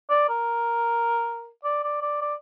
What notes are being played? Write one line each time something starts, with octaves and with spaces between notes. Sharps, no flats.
D5
A#4
D5
D5
D5
D5